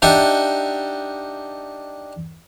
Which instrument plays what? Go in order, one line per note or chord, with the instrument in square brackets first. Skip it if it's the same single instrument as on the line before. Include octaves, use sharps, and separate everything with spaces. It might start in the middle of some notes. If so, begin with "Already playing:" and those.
[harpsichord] D4 D#4 G4 D#5 E5 F#5